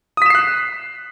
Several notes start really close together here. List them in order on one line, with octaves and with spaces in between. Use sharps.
D#6 B6 E7 C7 F#6